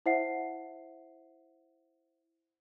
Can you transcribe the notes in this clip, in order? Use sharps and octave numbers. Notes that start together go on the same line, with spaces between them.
E4 C5 E5 F#5 C7